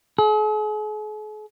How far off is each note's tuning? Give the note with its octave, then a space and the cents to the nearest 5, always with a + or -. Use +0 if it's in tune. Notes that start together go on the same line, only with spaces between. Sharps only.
G#4 +45